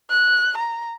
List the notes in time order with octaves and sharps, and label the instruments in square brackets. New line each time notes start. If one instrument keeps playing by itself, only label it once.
[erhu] F#6
A#5